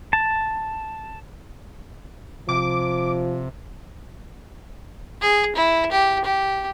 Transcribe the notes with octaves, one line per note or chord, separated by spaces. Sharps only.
A5
C3 F3 D6
G#4
E4
G4
G4